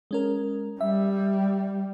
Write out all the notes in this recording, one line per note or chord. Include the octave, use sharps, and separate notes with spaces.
G#3 C#4 A#4
G3 E5